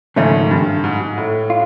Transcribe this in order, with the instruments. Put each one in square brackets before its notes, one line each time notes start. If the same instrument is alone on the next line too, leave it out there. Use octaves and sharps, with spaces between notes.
[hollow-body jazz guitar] D#2 C#3 F3 A3 C#4 [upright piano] G#2
[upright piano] G2
G#2
G#2
A2
[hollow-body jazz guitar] F4